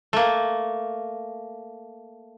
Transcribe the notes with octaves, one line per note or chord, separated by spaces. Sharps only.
A3 A#3